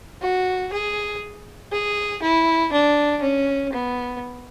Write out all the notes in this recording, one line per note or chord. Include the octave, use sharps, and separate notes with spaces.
F#4
G#4
G#4
E4
D4
C#4
B3